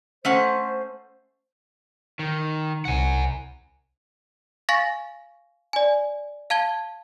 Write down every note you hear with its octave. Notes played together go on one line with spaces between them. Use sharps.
A3 C#4 C5 F#5
D#3
C2 F#5 G#5
F5 G#5 C#6 A6 A#6
D5 G#5
F5 A5 G#6 G7